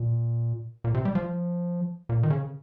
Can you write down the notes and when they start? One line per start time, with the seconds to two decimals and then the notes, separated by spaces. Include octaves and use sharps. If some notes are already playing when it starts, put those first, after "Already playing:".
Already playing: A#2
0.84 A#2
0.94 C3
1.05 G3
1.15 F3
2.09 A#2
2.23 D#3
2.30 C#3